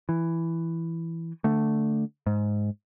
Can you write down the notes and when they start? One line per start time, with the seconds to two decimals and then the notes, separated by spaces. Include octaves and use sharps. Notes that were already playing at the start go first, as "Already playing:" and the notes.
0.09 E3
1.44 D3 A3
2.27 G#2